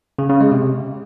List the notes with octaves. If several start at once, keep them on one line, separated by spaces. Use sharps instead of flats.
C#3
C#3
G#3
C3